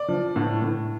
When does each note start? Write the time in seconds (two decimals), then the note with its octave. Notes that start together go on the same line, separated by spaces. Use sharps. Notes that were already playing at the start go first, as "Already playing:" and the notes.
Already playing: D5
0.08 F3
0.36 A2
0.62 A2